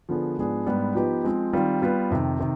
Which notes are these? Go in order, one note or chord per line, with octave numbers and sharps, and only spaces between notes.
D3 F3 B3 D4 G#4
G#2 F3 B3 D4 G#4
G#2 G3 B3 D4
F3 B3 D#4 G4 B4
F3 G#3 C4
D#3 G3 C4 F4
G3 B3 F4 B4
F2 C3 D#3
C3 D#3